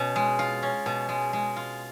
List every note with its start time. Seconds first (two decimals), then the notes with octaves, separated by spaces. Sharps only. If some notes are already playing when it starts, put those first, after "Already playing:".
Already playing: B2 C#4
0.16 G#3
0.39 F4
0.63 C#4
0.86 B2
1.09 G#3
1.33 G#3
1.56 F4